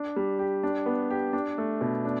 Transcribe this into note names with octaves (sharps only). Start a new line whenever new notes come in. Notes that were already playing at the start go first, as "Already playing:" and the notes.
Already playing: D4
G3
G4
D4
B3
G4
D4
A3
B2
D4